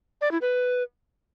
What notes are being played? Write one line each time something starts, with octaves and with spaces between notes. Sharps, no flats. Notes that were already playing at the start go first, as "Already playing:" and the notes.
D5
E4
B4